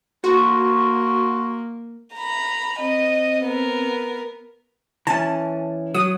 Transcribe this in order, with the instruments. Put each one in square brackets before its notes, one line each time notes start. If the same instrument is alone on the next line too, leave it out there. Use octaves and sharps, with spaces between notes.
[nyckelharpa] A#3 [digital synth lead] F#4 [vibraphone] C6 C#6
[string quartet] A#5 B5
[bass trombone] C4 [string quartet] D#5
[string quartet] B3 A#4
[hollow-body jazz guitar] E3 C#4 [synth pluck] A5
[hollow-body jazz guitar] F#3 [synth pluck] D#6